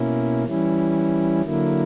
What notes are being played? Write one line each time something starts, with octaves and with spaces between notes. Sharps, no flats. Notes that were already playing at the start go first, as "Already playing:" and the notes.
Already playing: B2 A#3 C#4 E4
E3 G3 C#4 E4
D3 F#3 A#3 E4